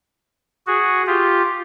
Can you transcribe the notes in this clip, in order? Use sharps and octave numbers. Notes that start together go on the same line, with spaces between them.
F#4 G#4
F4 G4